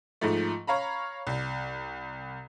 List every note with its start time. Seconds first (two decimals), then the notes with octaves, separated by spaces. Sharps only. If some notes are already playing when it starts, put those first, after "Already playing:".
0.21 G#2 F3 A3
0.67 C#5 F5 A#5 B5
1.27 C2